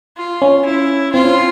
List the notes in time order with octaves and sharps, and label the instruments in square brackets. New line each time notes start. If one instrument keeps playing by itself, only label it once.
[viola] F4
[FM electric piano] C#4
[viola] E4
[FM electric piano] C4 [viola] F4
[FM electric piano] C#4